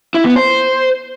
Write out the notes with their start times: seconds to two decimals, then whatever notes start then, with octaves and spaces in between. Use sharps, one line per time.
0.14 E4
0.25 B3
0.36 C5